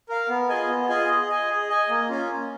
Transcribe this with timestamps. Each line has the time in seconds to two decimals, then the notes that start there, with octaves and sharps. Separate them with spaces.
0.09 A#4 F5
0.29 B3
0.49 F4 G#4 D#5 G#5
0.69 B3
0.89 F4 G#4 D#5 G#5
1.09 G#4
1.29 D#5 G#5
1.49 G#4
1.69 D#5 G#5
1.89 A#3
2.09 C#4 F4
2.29 A#3